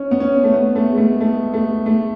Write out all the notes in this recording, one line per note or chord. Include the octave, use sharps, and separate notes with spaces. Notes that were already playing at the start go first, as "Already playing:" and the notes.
Already playing: C#4
B3
C#4
A3
B3
A3
G#3
A3
A3
A3
A3